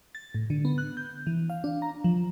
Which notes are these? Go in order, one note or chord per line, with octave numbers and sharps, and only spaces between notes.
A6
A2
D3
B3
F#6
G6
E3
F5
D4
A#5
F3